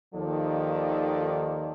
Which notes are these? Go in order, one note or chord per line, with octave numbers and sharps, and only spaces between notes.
D#2 D#3 F3 D#4 A4 D5